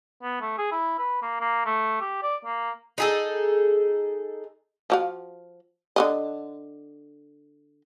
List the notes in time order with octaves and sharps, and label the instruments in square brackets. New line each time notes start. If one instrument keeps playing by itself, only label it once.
[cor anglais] B3
A3
G#4
E4
B4
A#3
A#3
A3
G4
D5
A#3
[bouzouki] D#4 G#4 A4
[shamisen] F3 F#4 F5
D3 A#3 D#5